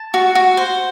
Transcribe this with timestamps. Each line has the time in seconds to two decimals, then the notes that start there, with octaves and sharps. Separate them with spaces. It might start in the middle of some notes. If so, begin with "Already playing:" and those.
Already playing: A5
0.14 F#4
0.35 F#4
0.57 C5